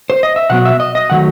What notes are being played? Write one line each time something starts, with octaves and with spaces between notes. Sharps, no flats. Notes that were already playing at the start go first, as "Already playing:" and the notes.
C5
D#5
E5
B2 F#3 B3 F#5
E5
D#5
D#5
D#3 F#3 A3 F#5